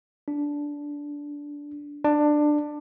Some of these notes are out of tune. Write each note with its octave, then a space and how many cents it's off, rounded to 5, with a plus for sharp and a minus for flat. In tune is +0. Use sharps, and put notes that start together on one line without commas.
D4 -15
D4 +15